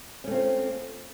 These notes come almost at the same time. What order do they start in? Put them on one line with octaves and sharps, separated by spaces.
C#4 A3 C4 F4